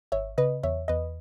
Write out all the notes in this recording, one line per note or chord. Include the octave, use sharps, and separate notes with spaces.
G#1 C#5 E5
C#3 B4 D#5
E2 C#5 E5
E2 B4 D#5